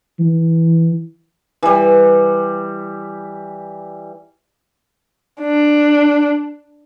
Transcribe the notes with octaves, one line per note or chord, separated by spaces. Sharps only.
E3
E3 G3
D4